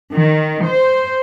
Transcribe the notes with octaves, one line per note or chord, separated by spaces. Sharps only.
D#3
C5